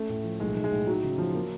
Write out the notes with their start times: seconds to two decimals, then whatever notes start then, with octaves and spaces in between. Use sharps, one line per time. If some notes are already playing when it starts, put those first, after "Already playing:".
Already playing: A3 C#4
0.09 A2
0.24 F3
0.40 B1 G#3
0.56 B1
0.64 G#3
0.72 A2
0.87 F#3 D#4
1.03 C#3
1.18 F3
1.35 A#3